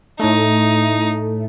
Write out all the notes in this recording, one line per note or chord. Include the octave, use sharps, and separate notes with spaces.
A2 A3 D#4